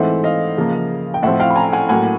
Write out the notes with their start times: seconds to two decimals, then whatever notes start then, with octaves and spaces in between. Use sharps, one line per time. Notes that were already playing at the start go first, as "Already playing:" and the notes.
Already playing: G#2 E3 A3 C4 E5 F#5
0.24 D#5 F5
0.57 C#3 F3 A#3
1.14 G5
1.23 A2 F3 A3 C4 E5 F#5
1.40 F5 G5
1.50 B5
1.56 G#5 A#5
1.73 F#5 G#5
1.89 A2 F#3 A#3 F#5 G#5